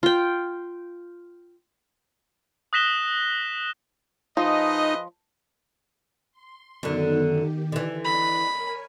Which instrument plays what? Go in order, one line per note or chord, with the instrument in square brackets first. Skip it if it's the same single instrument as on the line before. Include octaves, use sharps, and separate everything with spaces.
[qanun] F4 G5
[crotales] D#6 F#6 A#6 B6 E7 G7
[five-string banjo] F3 [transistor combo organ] D#4 [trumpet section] G#4 B4 D#5
[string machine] C6
[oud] F#2 D3 [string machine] D#3 B3 D#4
[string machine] D#3 G4
[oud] D3 E3
[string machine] D5 D#5 F#6 [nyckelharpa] B5
[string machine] A#4 C#5 G#5